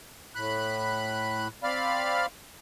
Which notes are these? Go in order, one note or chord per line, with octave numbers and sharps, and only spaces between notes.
A2 B5 F#6
C4 D5 F5 B5 F6